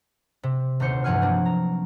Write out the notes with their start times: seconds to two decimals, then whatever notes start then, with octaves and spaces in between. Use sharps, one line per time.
0.43 C3
0.80 D#1 D2 B3 C5 C#7
1.04 E2 G2 F3 F#5 G#5 F6
1.22 F#3 A#3 C4 D4
1.45 A#5